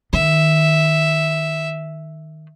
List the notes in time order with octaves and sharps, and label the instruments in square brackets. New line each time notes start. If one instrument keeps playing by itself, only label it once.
[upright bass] D#3 [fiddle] E5